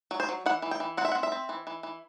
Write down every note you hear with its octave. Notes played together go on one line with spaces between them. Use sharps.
F#3
C5
F#3
E3 F#5
E3
G5
E3
C4 F#5
E5
F#5
C4
E5
C4
E3
E3
E3